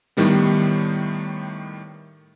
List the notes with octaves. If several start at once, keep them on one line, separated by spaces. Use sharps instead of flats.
A2 D#3 G3 B3